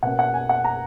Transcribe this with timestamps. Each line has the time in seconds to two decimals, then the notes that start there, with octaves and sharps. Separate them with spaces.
0.03 B2 A#3 C#4 F#5
0.19 F#5
0.34 G#5
0.49 F#5
0.64 A#5